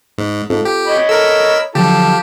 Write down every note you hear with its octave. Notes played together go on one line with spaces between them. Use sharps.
G#2
G#2 C4 F4 A4
G4
C#5 D#5 B5
A4 A#4 E6
D3 F3 F#3 F4 G4 A4 A5